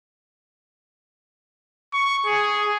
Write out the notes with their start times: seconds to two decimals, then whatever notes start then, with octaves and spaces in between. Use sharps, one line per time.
1.94 C#6
2.26 G#4